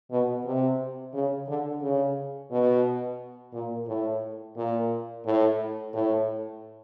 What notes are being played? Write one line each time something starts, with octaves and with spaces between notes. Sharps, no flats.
B2
C3
C#3
D3
C#3
B2
A#2
A2
A#2
A2
A2